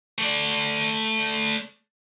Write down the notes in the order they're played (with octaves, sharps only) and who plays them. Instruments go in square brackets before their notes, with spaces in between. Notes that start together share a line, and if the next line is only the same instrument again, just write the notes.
[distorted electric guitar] A3 D5